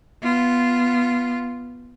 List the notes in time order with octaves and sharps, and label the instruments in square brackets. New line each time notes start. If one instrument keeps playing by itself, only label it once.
[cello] B3 F4